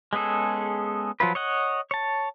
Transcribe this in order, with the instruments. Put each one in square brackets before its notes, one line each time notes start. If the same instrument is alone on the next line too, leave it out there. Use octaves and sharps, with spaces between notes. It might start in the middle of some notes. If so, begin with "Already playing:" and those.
[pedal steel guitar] G#3 B3 C#4 G#4 A4
F3 F#3 F4 B4
C#5 D#5 F#5
C#5 A5